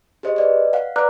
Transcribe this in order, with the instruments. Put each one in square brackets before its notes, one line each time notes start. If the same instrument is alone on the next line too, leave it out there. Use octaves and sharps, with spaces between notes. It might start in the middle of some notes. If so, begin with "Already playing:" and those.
[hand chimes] G4 G#4 C5 D#5
B4 D5 D#5
F5 F#5
B4 D5 A#5 D6 F6 F#6